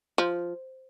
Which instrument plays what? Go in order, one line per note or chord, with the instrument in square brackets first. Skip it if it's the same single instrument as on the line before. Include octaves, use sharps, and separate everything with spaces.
[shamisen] F3